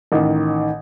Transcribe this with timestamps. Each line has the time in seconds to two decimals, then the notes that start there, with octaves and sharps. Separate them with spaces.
0.12 A1 D#3